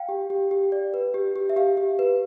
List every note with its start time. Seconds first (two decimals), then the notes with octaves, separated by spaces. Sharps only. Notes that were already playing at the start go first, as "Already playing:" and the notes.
Already playing: F5 G5
0.09 G4
0.30 G4
0.51 G4
0.72 D5
0.94 B4
1.14 G4
1.36 G4
1.49 E5
1.56 G4 F5
1.77 G4
1.99 B4